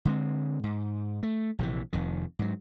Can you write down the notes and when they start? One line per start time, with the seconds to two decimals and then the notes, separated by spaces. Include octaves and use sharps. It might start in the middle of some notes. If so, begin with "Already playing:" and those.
0.05 D3 G#3 C4
0.63 G#2
1.23 A3
1.59 A#1 C3 D#3 E3
1.93 F1 F2 D#3
2.39 G#2 F#3